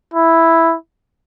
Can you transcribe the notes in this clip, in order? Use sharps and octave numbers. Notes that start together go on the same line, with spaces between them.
E4